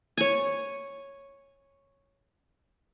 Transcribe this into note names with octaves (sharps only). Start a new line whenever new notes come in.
C#5 G#5